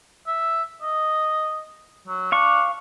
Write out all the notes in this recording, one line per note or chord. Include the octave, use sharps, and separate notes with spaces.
E5
D#5
F#3
D4 F5 C#6